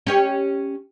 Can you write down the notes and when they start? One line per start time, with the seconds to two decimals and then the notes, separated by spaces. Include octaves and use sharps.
0.07 C#4 G4 C#5